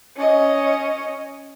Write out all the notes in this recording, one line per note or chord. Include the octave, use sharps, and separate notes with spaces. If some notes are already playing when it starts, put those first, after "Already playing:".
C#4 D#5